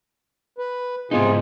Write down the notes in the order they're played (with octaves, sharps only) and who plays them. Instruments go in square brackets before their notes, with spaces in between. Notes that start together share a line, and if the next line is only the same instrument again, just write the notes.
[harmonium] B4
[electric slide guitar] G#2 B3 D#4 [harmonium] C3 F4 G#4